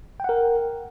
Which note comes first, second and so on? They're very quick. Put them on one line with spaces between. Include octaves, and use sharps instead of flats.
G5 F#5 A#4